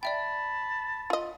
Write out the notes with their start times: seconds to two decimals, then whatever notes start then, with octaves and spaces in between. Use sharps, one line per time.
0.03 D5 E5 G5 A5 B5
1.10 F4 D#5